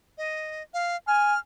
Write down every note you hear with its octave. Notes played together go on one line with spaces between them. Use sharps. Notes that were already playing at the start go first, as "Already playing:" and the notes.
D#5
F5
G#5 F6